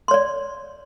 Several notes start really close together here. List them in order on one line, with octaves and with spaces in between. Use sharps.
C6 C#5 D5